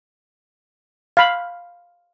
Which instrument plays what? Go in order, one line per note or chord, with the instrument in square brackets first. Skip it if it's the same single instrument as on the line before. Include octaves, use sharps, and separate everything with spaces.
[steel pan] F5 B5